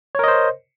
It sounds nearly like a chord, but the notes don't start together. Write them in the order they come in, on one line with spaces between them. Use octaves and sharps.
C#5 A#4 D#5 C5